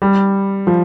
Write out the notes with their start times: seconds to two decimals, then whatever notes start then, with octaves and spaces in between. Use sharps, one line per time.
0.02 G3
0.67 F3